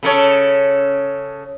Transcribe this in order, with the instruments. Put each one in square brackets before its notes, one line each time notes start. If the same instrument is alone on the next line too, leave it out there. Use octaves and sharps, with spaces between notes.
[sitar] C#3 A4 C#5